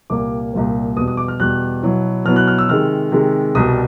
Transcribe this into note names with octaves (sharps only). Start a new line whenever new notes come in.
C2 A#2 G3 A#3 D6
C2 A#2 G3 A#3
E2 B2 G3 D#6
D#6
D6
F6
E2 B2 G3 F#6
B2 F#3 B3 E4
B2 F#3 B3 E4 F6
F#6
F6
E6
C3 D#3 G#3 F6
C3 D#3 G#3
C2 B2 G3 D#6